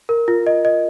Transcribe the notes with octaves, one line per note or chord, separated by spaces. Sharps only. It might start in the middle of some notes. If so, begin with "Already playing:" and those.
A#4
F4
D#5
D#5